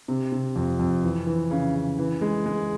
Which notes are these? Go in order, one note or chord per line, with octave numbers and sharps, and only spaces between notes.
C3
C3
F2
F2
E3
E3
C#3
C#3
E3
G#3
G#3